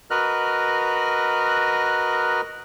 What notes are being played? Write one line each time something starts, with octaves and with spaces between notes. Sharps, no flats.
F#4 A#4 B4 D#5 F6 F#6